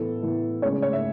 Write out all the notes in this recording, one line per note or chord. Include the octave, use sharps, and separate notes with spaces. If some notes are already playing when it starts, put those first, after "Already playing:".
Already playing: A2 E3 B3 A4
A2 E3 B3
C#3 G#3 C#4 C#5
C#5
E5